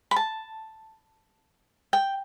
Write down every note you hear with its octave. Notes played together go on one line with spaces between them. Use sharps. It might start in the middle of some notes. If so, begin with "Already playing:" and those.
B5
A5
G5